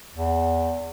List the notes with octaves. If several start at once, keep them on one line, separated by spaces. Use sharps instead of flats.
E2